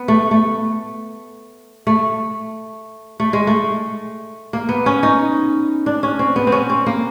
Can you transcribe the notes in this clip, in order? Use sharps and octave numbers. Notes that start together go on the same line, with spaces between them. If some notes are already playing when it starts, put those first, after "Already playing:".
Already playing: B3
A3
A3
A3
A3
G#3
A3
A#3
B3
C#4
D#4
D4
C#4
C4
B3
C4
C#4
C4
A#3